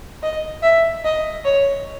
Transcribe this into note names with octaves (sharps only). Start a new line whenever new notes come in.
D#5
E5
D#5
C#5